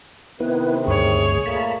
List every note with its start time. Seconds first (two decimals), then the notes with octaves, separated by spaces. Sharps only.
0.40 C3 D#3 B3 E4 B4
0.86 D2 G2 G#4 C#5
1.46 A#2 A3 A#3 A5 B5